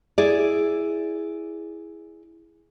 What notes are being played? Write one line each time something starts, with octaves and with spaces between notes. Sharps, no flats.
E4 G#4 D5